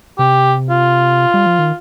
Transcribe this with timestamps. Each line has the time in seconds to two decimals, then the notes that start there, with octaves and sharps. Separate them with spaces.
0.19 C3 G4
0.70 F4
1.34 G3
1.46 F3
1.59 D#3